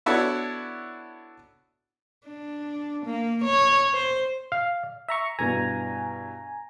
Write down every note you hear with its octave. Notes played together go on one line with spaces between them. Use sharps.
B3 D4 E4 F#4 A4 C#5
D4
A#3
C#5
C5
F5
E5 A#5 C#6
G2 B2 E3 G#5 A#5